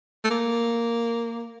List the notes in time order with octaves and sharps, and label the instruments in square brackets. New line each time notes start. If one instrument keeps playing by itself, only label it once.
[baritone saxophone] A3
A#3